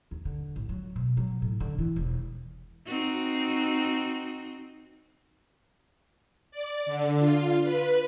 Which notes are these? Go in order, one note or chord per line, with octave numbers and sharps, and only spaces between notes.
D#2
D3
A1
F#3
B2
F#3
A2
D3
E3
E1
C4 D#4 F#4
D5
D3
F4
B4